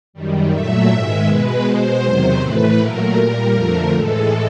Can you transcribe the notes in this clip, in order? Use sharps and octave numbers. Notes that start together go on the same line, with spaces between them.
F#2 D#3 G3
A#2 F#3 A3 E5
G#2 D#3 G#3
B2 G#3 B4
B2 G#3 C5
E2 C3 D#3 F#3
A2 E3 A3 B4
A#2 F#3 A3 A#4
A#2 G3
F2 D3 F3 A3
A2 E3 G#3 A4